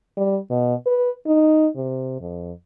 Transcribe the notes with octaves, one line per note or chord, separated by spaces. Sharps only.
G3
B2
B4
D#4
C3
F2